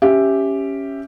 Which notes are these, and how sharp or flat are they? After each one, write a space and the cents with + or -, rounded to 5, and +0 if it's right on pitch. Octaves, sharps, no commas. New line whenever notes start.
C#4 +0 G4 +0 E5 +0